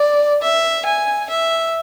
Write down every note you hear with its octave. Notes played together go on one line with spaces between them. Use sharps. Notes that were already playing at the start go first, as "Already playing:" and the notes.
Already playing: D5
E5
G#5
E5